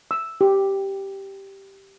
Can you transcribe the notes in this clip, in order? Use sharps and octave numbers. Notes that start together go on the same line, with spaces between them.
E6
G4